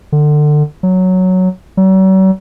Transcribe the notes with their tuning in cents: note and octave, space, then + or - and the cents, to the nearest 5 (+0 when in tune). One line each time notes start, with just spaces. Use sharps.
D3 +25
F#3 +0
F#3 +45